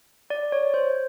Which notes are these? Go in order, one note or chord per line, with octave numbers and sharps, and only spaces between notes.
D5
C#5
C5